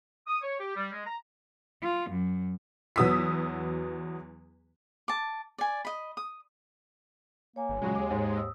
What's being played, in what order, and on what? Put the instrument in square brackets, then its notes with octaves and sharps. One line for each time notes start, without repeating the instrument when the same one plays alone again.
[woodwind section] D#6
C#5
G4
G3
G#3
A#5
[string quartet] F4
F#2
[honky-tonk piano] E2 F#3 B3 D#6 E6 B6
[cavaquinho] A5 D6
D5 G#5
D#5 B5
D#6
[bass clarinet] A#3 [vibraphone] C#5 G#5
[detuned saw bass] G1
[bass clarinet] A#2 [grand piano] C#3 F#3 F#4 [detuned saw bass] G#3
[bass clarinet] D#2 [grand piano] D6
[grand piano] G#2
[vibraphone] D#6 E6